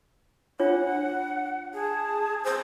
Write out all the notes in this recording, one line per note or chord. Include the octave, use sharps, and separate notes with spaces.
D4 F4 C#5 F#5
G#4 A5
C5 D#6